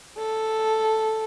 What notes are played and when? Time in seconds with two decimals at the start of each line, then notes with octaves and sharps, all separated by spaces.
0.17 A4